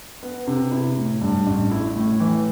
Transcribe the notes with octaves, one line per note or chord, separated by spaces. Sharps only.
B3
C3
E4
A2
G2
A1
E4
A2
E3